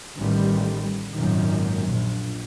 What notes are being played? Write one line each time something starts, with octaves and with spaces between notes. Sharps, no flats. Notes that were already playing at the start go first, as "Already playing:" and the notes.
A1 D#3 G3
G#1 F#2 A#2 D#3
A#1